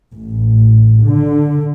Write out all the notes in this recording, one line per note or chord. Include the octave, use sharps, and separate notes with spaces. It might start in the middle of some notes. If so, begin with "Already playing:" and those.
A1
D3